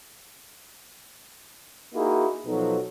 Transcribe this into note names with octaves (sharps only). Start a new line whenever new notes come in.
A#3 D#4 E4 F#4 G#4
B2 F3 F#3 D#4 A4